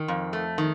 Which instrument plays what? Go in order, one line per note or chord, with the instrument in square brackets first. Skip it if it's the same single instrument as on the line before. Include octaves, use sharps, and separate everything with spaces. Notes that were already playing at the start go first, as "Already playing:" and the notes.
Already playing: [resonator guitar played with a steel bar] D#3
F2
A3
D#3